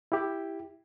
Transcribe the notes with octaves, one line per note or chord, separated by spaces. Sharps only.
E4 G4